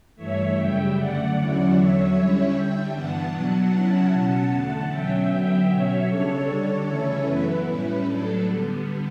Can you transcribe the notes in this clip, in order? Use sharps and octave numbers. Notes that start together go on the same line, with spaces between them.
G2 E3 A3 C#5 E5
F#2 C#3 G3 E5 G5
F#2 D3 A3 D5 F#5
E2 D3 F#3 C#4 E4 D5 F#5
E2 D3 F#3 C#5 E5
D3 G3 C#4 E4 C#5 E5
D3 G3 D4 E5 G5
G2 E3 B3 D4 F#5 A5
B2 F#3 B3 D4 F#5 A5
C#3 F#3 C#4 E4 F#5 A5
B2 F#3 C#4
E2 D3 A3
B2 F#3 C#4 E5 G5
D3 F#3 B3
B2 F#3 C#4 C#5 E5
C#3 G3 D4 A4 C#5
D3 G3 D4 A4 C#5
C#3 E3 A3 C#4 E4
F#2 E3 B3 E4 B4
A2 G3 C#4 E4
A2 F#3 A3 D4 A4
D3 G3 B3